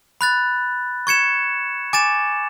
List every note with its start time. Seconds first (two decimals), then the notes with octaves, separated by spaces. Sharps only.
0.21 B5 F#6 A6
1.07 C#6 G#6 C#7 E7
1.93 G#5 D6 A6 E7